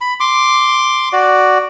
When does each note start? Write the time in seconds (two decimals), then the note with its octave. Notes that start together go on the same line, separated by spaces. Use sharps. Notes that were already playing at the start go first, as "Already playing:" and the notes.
0.01 B5
0.20 C6 D6
1.13 F#4 D5